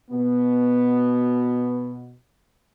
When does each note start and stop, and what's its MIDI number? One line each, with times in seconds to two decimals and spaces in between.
0.11 2.16 47
0.11 2.16 59